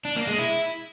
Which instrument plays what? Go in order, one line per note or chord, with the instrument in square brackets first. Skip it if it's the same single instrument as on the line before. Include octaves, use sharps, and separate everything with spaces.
[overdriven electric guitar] D4
A#3
G#3
E4